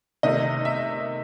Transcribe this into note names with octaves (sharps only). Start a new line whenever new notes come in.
C3 D#3 A3 D#4 D#5
E5